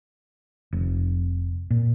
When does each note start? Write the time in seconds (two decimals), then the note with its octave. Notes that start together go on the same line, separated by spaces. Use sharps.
0.73 F1
1.70 A#2